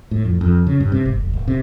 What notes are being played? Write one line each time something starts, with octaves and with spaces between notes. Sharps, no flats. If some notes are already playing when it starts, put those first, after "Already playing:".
A2
F2
F2
C#3
G2
C3
G#1
F1
D1
C3